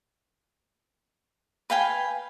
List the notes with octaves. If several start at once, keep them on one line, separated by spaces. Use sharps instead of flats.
B4 F5 G5 G#5